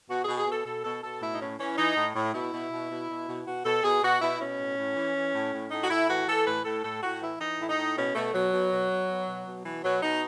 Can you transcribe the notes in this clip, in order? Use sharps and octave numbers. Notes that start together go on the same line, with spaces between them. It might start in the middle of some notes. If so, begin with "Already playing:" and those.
B2 F#4
B2 G#4
G#4
B2 A4
B2 A4
B2 A4
B2 A4
A2 E4
D#4
A2 C#4
E3 C#4
E3 D#4
A2
A2
B2 E4
B2
B2
B2
B2
B2
B2 F#4
B2 A4
B2 G#4
B2 F#4
B2 E4
B2 C#4
A2
A2
E3
E3
A2
A2
A2 D#4
F#4
A2 E4
E3 F#4
E3 A4
A2 B4
A2 A4
A2 A4
A2 F#4
E3 E4
E3 D#4
A2 E4
D#4
A2
B2 C#4
B2 A3
B2 F#3
B2
B2
B2
B2
B2
B2
B2 E3
B2 F#3
B2 D#4